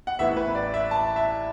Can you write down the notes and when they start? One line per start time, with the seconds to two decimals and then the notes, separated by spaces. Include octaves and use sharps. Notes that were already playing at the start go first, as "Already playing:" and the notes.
0.07 F#5
0.19 A1 A2 E3 B3 E5
0.37 B4
0.55 D5
0.74 E5
0.91 A5
1.16 E5